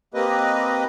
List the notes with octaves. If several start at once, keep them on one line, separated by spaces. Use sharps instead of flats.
A#3 C4 G4 B4 D#5